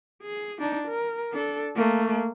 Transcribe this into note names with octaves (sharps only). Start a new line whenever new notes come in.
G#4
D4 D#4
A#4
D4 A4
A3 A#3